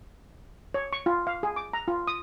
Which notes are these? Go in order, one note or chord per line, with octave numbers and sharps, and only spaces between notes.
C#5
C#6
F4
F5
G#4
D6
A#5
F4
D#6